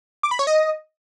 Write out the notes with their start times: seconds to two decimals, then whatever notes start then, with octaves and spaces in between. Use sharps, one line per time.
0.23 D6
0.31 B5
0.39 C#5
0.47 D#5